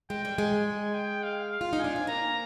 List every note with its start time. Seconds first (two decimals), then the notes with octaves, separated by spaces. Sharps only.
0.10 G#3 G5
0.25 G3
0.38 G#3 G#5
0.94 G5
1.23 F5
1.51 F5
1.61 F4
1.73 D#4
1.79 D4 G#5
1.96 C4
2.07 A#3 A#5